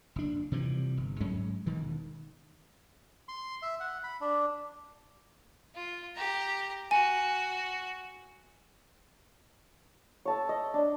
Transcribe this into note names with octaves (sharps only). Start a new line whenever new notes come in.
F#1 D4
C3 E3 F3 G3
G1
G#2 F#3 G#3 C#4
E1 D#3 E3
C6
E5
F#5
B5
D4
F4
G4 A#5
F#4 G#5
C#5 A5 E6
D#5
D4